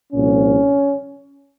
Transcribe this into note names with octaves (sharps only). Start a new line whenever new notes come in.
C2 A#2 F3 C#4